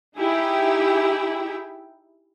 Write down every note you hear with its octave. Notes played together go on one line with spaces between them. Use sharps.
D#4 E4 G4 G#4 E5 G5